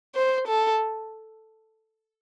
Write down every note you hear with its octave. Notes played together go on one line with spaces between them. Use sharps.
C5
A4